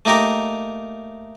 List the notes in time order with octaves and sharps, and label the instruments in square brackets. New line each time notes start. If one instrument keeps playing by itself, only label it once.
[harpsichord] A3 A#3 D#4 G4 A#4